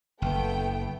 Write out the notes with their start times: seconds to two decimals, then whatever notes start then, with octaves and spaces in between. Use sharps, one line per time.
0.22 F#1 A3 B3 G5